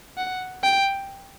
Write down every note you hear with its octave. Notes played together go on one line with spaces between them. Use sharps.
F#5
G5